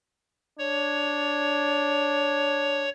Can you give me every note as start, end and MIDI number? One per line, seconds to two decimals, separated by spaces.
0.59 2.87 62
0.59 2.90 73